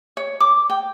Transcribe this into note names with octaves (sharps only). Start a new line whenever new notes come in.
C#5
D6
G5